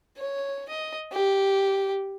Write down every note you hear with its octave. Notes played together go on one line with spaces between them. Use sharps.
C#5
D#5
G4